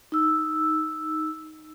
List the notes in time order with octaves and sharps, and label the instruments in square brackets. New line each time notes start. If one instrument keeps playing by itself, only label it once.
[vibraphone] D#4 E6